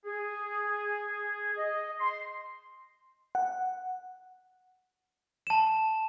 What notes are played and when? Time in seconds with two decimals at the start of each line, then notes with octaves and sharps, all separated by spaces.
0.05 G#4
1.58 D#5
1.99 C6
3.35 F#5
5.47 A5 E7